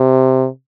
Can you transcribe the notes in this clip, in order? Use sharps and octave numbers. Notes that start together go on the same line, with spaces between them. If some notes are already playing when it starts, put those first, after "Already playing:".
Already playing: C3